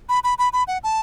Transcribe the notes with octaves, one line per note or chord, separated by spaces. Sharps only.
B5
B5
B5
B5
F#5
A5